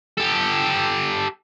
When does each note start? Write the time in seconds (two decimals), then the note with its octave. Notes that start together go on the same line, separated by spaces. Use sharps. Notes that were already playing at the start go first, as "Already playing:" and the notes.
0.18 G4 A4